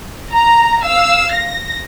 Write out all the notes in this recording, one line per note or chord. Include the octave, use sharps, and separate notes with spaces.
A#5
F5 E6
A#6